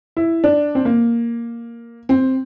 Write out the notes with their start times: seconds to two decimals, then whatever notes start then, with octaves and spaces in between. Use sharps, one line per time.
0.17 E4
0.44 D4
0.75 C4
0.85 A#3
2.09 C4